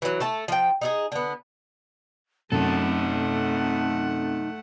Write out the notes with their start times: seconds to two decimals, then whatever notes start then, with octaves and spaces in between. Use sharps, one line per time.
0.02 E3 F#3
0.20 A3 A4 A5
0.48 F3 G5
0.81 D#4 E4 G#4
1.12 D3 B3
2.52 F#2 A3 C4 D#4 A4 F#5